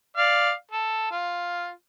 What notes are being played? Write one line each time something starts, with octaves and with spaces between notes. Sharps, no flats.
D5 F5
A4
F4